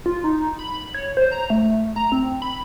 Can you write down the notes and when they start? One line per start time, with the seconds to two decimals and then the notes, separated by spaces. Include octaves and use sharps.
0.06 F4
0.24 D#4
0.59 B5
0.94 C#5
1.17 C5
1.32 A#5
1.50 A3
1.96 A#5
2.12 C4
2.42 B5